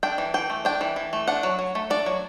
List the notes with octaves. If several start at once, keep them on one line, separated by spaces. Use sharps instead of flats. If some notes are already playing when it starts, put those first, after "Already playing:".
D4 G5
E3
E3 G5
A3
D4 G5
E3
E3
A3
D4 F#5
F#3
F#3
A3
D4 D5
F#3